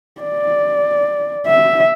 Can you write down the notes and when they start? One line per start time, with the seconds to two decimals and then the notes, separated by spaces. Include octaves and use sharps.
0.22 D5
1.47 E5